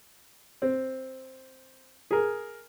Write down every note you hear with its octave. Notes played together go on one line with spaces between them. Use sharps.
C4
G#4 A#4